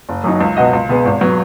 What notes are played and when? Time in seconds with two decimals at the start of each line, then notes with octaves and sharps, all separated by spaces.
0.09 F#1
0.24 F#2 F#3 D#4
0.41 C#2
0.56 B2 B3 F#4 D#5
0.73 C#2
0.89 B2 B3 G#4
1.06 G#1
1.21 F#3 B3